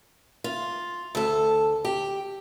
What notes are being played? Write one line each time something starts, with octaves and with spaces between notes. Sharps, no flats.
F4
D2 A4
G4